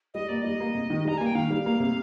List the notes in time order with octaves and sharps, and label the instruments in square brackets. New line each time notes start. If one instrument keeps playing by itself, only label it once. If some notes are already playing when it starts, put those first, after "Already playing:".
[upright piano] G3 [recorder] D#5
[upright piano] A#3 [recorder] D5
[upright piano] G3 [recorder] D#5
[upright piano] A#3
C3
D#3
[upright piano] G3 [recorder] A#5
[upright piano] A#3 [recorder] G#5
[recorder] G5
[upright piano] D#3 [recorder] F5
[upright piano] G3
A#3
C3